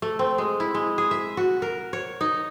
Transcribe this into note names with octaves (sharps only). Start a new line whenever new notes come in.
A3
C4
G#3
E4
G#3
G#4
E5
F#4
A#4
C#5
D#4